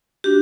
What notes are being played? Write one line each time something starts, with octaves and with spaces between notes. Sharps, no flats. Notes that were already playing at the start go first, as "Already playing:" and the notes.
D4 F#4 G4